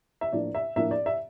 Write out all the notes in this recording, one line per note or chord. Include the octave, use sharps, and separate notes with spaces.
E5
A2 F3 A#3 D4 D5
E5
A2 F3 A#3 D4 E5
D5
E5